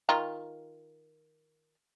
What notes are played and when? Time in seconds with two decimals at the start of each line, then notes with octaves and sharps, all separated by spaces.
0.09 D#3 F4 A#5